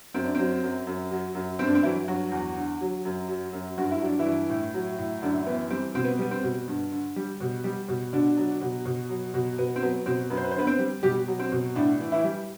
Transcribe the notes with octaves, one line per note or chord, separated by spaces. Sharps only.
F#2 C4
D4
F#3 C4
F#2
F#2
F#3
F#2
G2 C4
D4
C4
E3 F#3 E4
G2 F#3 F#4
E2
D3
F#3
F#2
F#3
F#2
G2 F#4
E4
F#3 D4
E3 E4
G2
A2
F#3
A2
F#2 D3 D4
E3 B3
G3 C4
B2 C4
B3
G3 B3
C4
B2
G2
D3
G3
B2
G3
B2
B2 D3 D4
F#3
B2
B2
F#3
B2
B2 B3
C4
F#3 B3
B2 C4
F#2 B4
C5
B4
C5
D3 B3 B4
C4 C5
G3
B2 G3 G4
F#3
C4
B2
A2 D3 D4
E3
E3 E4
G3